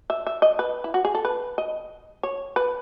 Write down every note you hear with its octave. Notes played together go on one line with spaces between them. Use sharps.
E5
E5
D#5
B4
E4
F#4
G#4
A4
B4
D#5
C#5
B4